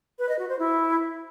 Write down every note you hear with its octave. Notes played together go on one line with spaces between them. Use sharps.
B4
D#5
F#4
C5
E4